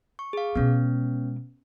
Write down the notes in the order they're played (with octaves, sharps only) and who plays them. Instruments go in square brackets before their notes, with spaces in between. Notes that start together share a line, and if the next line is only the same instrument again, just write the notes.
[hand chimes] C#6
G#4 F5
[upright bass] B2 G#3 [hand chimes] B3 C#4